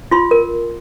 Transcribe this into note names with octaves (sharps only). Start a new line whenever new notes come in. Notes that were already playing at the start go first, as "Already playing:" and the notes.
F4 C6
A#4